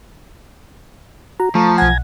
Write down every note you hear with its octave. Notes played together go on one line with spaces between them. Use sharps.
F#4 A#5
F3 A3 A5 A#5 C#6
B1 F#5 G#5 A#5 G#6